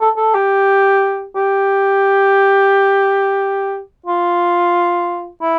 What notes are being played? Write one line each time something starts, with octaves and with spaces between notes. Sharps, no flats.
A4
A4
G4
G4
F4
E4